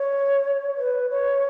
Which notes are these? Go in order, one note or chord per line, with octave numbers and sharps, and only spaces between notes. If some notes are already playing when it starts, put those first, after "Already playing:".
Already playing: C#5
B4
C#5